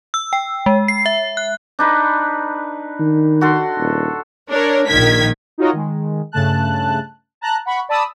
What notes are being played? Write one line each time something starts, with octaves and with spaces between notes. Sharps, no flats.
E6
G5
G#3
C7
E5
F#6
D4 D#4 B4
D#3
F#4 A4 C6
D#1
D4 A#4 C#5
A#1 D#3 G#6 B6
D#4 F4 F#4 A#4 C#5 D#5
D#3 G#3
G2 C#3 A3 A5 F#6
A5 A#5 F#6
F#5 B5 C#6
D5 A5 B5 D#6 E6